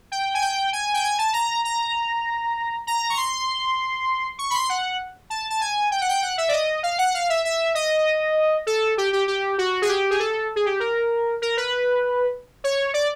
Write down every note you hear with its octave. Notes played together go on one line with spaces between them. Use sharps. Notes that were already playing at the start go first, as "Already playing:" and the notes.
G5
G#5
G5
G#5
G5
G#5
A5
A#5
A#5
A#5
C#6
C6
C#6
B5
C6
F#5
A5
A5
G#5
G5
F#5
G5
F#5
E5
D5
D#5
F5
F#5
F5
E5
E5
D#5
A4
G4
G4
G4
F#4
G#4
G4
G#4
A4
G#4
G4
A#4
A#4
B4
C#5
D5